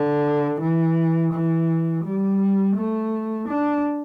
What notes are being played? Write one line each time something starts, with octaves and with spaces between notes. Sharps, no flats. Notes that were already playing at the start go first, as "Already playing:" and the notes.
Already playing: D3
E3
E3
G3
A3
D4